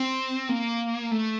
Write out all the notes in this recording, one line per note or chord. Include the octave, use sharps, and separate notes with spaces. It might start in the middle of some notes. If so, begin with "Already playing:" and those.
Already playing: C4
A#3
A3